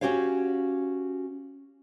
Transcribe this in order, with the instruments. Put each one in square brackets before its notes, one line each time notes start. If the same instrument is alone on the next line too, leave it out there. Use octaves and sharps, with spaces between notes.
[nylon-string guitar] C#4 D4 F#4 G4 C#5 F5